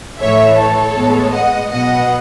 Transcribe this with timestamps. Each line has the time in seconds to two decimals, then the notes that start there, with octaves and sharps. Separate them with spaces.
0.20 A2 E3 A3 C#5 E5
0.57 A4 C#5
0.95 A2 G#3 B3
1.32 D#5 F#5
1.69 B2 F#3 B3 D#5 F#5